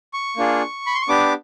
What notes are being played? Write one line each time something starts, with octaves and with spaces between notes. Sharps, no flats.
C#6
A#3 D4 F4 G#4
B5
C6
C#6
B3 D4 G4 D6